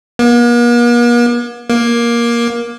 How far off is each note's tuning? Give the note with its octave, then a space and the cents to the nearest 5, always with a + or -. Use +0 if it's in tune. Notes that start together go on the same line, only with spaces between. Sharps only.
A#3 +45
A#3 +15